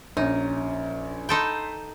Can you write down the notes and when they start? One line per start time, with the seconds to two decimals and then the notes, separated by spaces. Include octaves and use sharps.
0.17 A#1 C#4 D#4
1.29 D#4 A4 G5 B5 C6